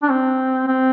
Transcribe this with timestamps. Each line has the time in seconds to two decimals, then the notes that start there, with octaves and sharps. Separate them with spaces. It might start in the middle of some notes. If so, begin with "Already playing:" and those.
0.03 D4
0.10 C4
0.68 C4